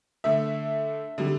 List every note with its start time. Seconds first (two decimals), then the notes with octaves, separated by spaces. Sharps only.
0.24 D3 A3 E5
1.18 D3 G3